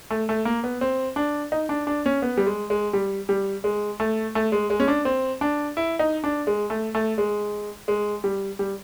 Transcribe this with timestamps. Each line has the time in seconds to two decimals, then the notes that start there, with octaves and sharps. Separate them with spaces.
0.10 A3
0.29 A3
0.45 A#3
0.64 B3
0.81 C4
1.16 D4
1.52 D#4
1.69 D4
1.87 D4
2.06 C#4
2.22 B3
2.37 G3
2.46 G#3
2.70 G#3
2.93 G3
3.29 G3
3.64 G#3
4.00 A3
4.35 A3
4.52 G#3
4.70 G#3
4.80 C#4
4.88 D4
5.05 C4
5.41 D4
5.77 E4
5.99 D#4
6.24 D4
6.47 G#3
6.70 A3
6.95 A3
7.18 G#3
7.88 G#3
8.24 G3
8.59 G3